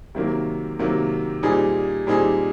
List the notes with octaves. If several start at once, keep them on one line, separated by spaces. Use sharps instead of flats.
C3 D#3 F#3 A#3
C3 D#3 F#3 A#3
A#2 G3 C4 D#4 G#4
A#2 G3 C4 D#4 G#4